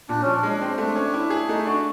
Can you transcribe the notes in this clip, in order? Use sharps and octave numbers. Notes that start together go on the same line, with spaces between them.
A#2 D4
F3 C#4
D4
G#3
C4
A3 D4
C#4
E4
G#4
A3 D#4
D4 F#4